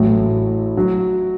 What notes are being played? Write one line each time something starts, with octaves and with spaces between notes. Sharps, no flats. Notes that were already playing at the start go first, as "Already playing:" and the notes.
Already playing: A1 A2 F#3
F#3